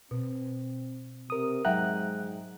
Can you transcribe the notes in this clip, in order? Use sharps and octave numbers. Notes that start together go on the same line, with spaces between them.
B2 C4
C3 A#4 D#6
G#2 F#3 E5 F#5 G5 A#5 F#6